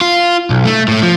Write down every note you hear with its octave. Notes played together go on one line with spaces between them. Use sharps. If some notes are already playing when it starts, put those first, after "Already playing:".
F4
B1
A3
A2 A3
F3